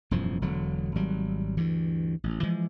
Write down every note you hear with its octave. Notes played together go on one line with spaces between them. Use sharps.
E1 F#2 A2 F3
E1 D3 F#3
G#1 F#3 G3
D2 G2 E3
A1
E3 F3 G#3